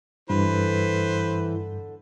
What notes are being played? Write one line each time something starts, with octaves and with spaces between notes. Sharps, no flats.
E2 G2 D3 E3 B4 C5